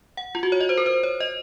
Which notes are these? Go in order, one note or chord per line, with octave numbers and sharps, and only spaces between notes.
F#5
F4
F#4
C#5
D#5
C5
A#4
C5
C#5
D#5